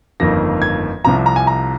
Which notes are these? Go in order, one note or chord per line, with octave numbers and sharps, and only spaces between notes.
G1 F2 D#3 A#3 A#6
G#6
C2 C3 F3 A#5
A#5
G#5
A#5